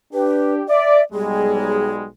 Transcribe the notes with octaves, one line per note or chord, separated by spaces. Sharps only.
D4 G4 B4
D5 E5
B1 G3 G#3 G#4